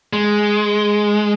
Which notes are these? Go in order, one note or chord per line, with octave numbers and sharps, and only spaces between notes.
G#3